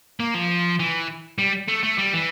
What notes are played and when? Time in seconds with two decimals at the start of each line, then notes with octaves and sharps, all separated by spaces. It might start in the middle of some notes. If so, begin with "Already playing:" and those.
0.20 A#3
0.34 F3
0.79 E3
1.38 G3
1.68 A3
1.83 A3
1.98 G3
2.14 E3